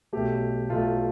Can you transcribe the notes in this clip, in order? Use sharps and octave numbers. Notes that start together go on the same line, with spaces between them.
B1 B2 A3 G4
B1 B2 A3 F4